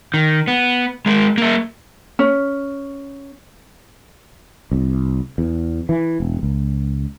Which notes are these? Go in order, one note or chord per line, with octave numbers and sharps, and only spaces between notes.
D#3
B3
G#3 A#4
A#3 E5
C#4
C2
E2
E3
E1
C#2